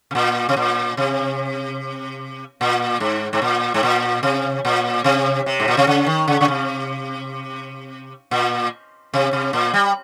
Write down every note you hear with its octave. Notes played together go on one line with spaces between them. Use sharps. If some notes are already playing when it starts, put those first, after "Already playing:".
C3
A#2
C3
A#2
C3
A#2
G#2
G#2
A#2
G#2
A#2
C3
A#2
C3
C3
G#2
A#2
C3
C#3
D#3
C#3
C#3
C3
A#2
C3
C3
A#2
G3